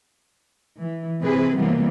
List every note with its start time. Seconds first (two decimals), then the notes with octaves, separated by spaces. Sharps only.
0.78 E3
1.22 C3 E3 C4 G#4 B4
1.57 C3 E3 F#3 G3 A#3 B3